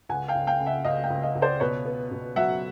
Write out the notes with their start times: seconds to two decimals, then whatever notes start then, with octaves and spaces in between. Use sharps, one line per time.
0.09 C#2 F#5 G#5
0.28 F5 G5
0.35 C#2
0.47 F5 G5
0.60 C#3
0.66 E5 F#5
0.85 C#2 D#5 F5
1.04 F5 G5
1.10 C#2
1.22 D#5 F5
1.35 C#2
1.42 C5 D5
1.60 B2 B4 C#5
1.85 B3
2.11 B2
2.36 F#3 E5 F#5